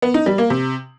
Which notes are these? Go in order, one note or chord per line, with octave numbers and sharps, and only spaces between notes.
B3
D#4
G3
A#3
C3